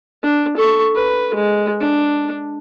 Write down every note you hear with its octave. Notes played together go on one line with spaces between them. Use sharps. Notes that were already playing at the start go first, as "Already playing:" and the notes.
D4
A4 C#6
B4
G#3
D4